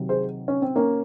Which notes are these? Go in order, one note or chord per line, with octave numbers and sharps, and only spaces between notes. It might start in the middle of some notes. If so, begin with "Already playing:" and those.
Already playing: C3 D#3 F#3
G#4 C5
C#4
C4
A#3 C#4